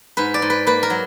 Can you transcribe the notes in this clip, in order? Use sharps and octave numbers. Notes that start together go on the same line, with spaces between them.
G#2 B4
D5
G#2
B4
A#3 B4
A#4
F#3